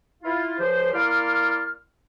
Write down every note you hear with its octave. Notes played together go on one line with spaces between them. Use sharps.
E4 F4
C#2 F3 G4 C5
A#3 E4 D5 C6 F6